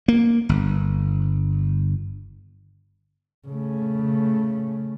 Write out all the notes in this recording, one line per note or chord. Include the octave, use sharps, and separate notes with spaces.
A#3
G1
C#3 A3